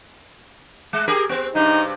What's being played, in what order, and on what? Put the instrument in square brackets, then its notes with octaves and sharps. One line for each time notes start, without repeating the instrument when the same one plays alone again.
[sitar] G#3
G4 G#4 A#4
B3 C4
[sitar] G2 C3 [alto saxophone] D#4